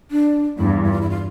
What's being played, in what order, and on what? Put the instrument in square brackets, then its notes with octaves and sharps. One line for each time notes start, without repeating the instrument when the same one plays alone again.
[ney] D4
[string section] E2 G2 [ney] E4
[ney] E4
F4
E4
F4